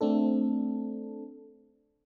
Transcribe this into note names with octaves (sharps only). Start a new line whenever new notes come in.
A3 C4 D4 A4